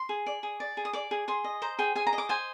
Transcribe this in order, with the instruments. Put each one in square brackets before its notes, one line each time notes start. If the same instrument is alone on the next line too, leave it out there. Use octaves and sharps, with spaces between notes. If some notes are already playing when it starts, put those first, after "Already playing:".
Already playing: [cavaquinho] C6
G#4
D5
G#4
D5
G#4
D#6
D5 D6
G#4
G#4 C6
D#5
C5 A#5
G#4 G5
G#4 G#5
A#5
D#5
D6
C5 G#5